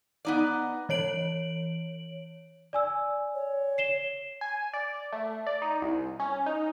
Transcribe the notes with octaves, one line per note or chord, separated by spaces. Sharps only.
B3 D#4 D5
E3 C#5 D7 F#7
D5 G#5 E6
C#5
C7 E7 G7
G#5
D5
A3
D5
D#4
C2
C#4
D#4